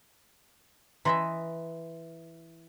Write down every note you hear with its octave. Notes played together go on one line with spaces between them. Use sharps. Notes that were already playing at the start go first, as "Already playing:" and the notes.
E3 D#5 E5 A#5 C6